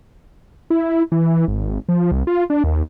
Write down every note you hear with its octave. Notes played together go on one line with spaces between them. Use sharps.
E4
E3
G#1
F3
C2
F4
D4
D#2